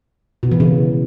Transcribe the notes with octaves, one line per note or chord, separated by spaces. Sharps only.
B2
E3
C#3